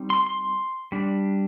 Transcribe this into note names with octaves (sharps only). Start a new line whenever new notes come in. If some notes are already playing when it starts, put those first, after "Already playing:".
Already playing: G3 C4 D#4
C6
C6
G3 D4